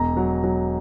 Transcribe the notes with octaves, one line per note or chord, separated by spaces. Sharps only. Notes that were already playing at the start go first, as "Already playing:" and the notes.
Already playing: E1 A#5
F#3
F#3